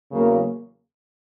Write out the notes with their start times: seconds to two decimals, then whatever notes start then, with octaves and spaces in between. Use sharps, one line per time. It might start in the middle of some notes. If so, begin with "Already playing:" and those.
0.11 E2 C#3 F#3 A#3